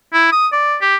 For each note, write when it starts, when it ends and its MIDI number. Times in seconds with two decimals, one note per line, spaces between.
0.13 0.30 64
0.32 0.48 87
0.52 0.76 74
0.81 0.96 67